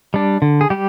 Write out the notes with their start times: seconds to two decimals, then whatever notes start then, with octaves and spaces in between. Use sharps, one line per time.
0.14 G3 D4
0.42 D3
0.61 G#4
0.70 G3 G4